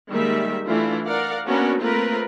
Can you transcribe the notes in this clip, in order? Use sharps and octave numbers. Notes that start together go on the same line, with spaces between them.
D#3 G3 G#3 A#3 E5
E3 A3 D4 E4 F4
A#4 D5 F5 F#5
A#3 B3 C#4 D4 F#4 A#4
A3 A#3 C4 F4 A#4 B4